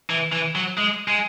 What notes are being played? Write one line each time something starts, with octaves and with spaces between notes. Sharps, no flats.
E3
E3
F#3
G#3
G#3